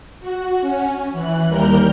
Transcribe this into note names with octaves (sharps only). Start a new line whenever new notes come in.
F#4
C#4
E3 F#6
D#2 G3 A#4 F6 G6